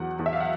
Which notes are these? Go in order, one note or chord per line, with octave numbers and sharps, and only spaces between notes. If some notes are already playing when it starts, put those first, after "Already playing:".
Already playing: E2 F#3 F#5
E2
E5
F5
F#5